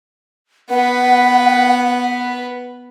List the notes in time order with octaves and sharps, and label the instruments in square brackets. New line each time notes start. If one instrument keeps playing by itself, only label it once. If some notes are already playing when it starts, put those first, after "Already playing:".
[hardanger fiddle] B3 B4 [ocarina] F#5